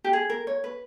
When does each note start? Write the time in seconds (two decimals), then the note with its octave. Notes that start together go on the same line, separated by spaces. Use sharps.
0.04 G4
0.13 G#4
0.30 A#4
0.47 C#5
0.64 B4